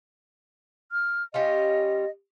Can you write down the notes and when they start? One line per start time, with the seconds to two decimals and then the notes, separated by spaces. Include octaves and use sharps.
0.92 F6
1.34 G3 C#4 F4 D#5